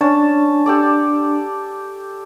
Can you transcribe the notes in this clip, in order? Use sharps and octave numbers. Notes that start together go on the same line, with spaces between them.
C#4 D4 A5
G4 A4 D5